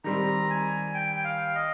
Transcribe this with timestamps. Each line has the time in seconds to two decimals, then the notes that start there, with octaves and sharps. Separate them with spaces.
0.04 D#3 G3 C4 A#5
0.50 G#5
0.94 G5
1.16 G5
1.25 F5
1.55 D#5